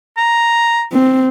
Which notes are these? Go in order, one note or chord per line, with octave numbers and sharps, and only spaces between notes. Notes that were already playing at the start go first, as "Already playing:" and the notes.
A#5
C4